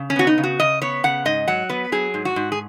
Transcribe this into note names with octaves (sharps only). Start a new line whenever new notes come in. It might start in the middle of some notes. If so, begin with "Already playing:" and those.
Already playing: C#3
C#4
B3 F#4
D#4
C#3
F#4
C#3 D#5
B3 C#5
C#3 F#5
G#2 D#5
F#3 F#5
B3 B4
F#3 G#4
G#2
F#4
G#2
G#4